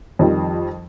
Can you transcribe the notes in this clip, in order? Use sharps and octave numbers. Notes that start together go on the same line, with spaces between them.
F2 D#3 F3 G3